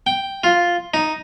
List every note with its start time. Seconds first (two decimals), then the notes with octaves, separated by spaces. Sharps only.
0.07 G5
0.44 F4
0.94 D#4